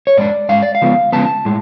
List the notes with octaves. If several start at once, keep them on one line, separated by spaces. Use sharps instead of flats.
C#5
G#2 G#3 D4 D5
G#2 G#3 F5
D5
F5
C#3 F3 G#3 B3
C#3 F3 G#3 B3 A5
A2 G#3